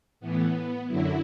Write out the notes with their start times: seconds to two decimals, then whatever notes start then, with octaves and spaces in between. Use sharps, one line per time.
0.20 A2 E3 B3
0.87 F#2 D3 F#3 E4